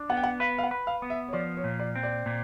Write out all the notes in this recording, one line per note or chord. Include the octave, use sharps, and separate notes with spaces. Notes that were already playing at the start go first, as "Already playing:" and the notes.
Already playing: D4
B3 F#5
G5
F#5
B4 F5
F5
F#5
B4
F5
B3
E5
C#5
F3 D5
C#5
A#2
D5
C4
D5
A#2